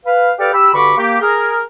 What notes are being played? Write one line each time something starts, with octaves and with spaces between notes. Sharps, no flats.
B4 F5
G4 A4 B4 D5 F5 G5
G4 B5 E6
G2 D3 F#4 B5 C#6 D6
A#3 G4
G#4 A#4